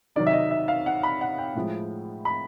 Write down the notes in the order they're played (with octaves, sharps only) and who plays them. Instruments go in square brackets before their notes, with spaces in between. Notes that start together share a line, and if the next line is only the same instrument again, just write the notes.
[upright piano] C3 D#3 F#3 D5
E5
D#5
E5
F5
F#5
B5
F#5
G5
A2 F3 G#3
B5